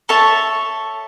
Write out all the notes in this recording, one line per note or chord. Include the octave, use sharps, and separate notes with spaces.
A4 C#5 E5 A5